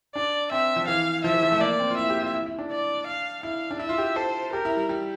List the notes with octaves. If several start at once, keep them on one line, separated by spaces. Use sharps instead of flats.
D4 D5
C4 E5
F3
E3 F5
F3 E5
E3
F3
A3
A#3 D5
C4
F4
E4 E5
G4
F4
E4
E4
D4
D5
F5
E4 F5
D4
E4 E5
F4
G4
A4 C5
G4 A#4
E4
G3
G3